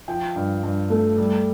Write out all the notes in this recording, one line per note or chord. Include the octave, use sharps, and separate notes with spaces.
F3 G5
G2
G2
A3
G3